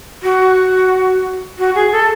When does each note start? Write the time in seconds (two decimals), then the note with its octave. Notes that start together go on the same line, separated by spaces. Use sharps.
0.23 F#4
1.59 F#4
1.75 G#4
1.92 A4